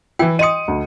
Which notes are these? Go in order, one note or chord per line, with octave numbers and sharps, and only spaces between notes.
E3 E4 G5
D#5 C6 D#6 C#7 D#7
D2